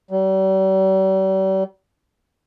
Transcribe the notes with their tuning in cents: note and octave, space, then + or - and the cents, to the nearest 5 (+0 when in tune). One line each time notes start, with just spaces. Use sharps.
G3 -40